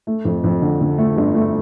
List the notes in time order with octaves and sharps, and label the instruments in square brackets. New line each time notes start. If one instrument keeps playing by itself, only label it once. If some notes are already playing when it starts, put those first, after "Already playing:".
[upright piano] A3
F2
F2
D3
D3
A3
G1
A3